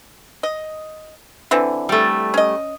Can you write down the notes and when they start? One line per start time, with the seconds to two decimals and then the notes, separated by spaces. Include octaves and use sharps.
0.43 D#5
1.51 D3 E3 C4
1.89 G3 A3
2.34 C#4 D#5